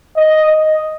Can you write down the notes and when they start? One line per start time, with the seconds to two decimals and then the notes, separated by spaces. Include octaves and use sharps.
0.17 D#5
0.48 D#5